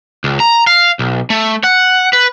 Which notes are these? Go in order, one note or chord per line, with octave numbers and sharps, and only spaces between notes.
C#2
A#5
F5
B1
A3
F#5
B4